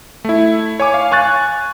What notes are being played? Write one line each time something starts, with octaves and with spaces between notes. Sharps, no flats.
A3 E4
C#5 G#5 D6
F5
G#5 C#6 F#6 A6